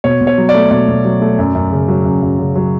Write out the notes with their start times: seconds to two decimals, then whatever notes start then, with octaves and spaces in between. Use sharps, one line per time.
0.04 B2 C#5
0.21 B2
0.27 C#5
0.38 F#3
0.49 D5
0.54 A3
0.71 B2 D5
0.88 B2
1.04 F#3
1.21 A3
1.39 F#2
1.55 F#2
1.71 C#3
1.88 F#3
2.05 F#2
2.22 F#2
2.39 C#3
2.56 F#3